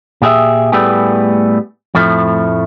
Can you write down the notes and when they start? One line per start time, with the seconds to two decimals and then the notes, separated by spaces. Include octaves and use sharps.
0.22 A#2 G4 G#4 A#4 E5
0.72 A2 G3 A3 B3 G4 G#4
1.95 F2 A2 F3 A3